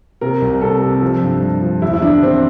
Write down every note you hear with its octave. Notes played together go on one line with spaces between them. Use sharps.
C3 A#4
C2
C3 A4
C3
F3
G2
G2
F3
E2 E4
E4
D3 D4
E2 C4